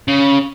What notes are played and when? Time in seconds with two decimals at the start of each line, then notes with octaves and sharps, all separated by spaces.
0.08 C#3